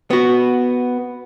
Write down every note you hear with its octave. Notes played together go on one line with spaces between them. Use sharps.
B3 F#4